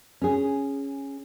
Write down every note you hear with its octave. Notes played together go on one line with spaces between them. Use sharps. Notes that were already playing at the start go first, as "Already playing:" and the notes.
C#4 G#4